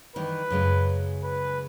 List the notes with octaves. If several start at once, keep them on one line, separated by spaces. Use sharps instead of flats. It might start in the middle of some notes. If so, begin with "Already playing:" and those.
D#3 E3 G3 B4
F#2 C#3 G#3
B4